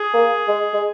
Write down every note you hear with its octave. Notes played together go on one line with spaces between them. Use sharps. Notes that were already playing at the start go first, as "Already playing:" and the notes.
Already playing: G#4
A#3
G#3
G#3